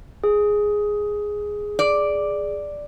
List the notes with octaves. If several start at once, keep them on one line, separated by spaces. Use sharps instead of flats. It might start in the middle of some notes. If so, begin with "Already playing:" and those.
G#4
D5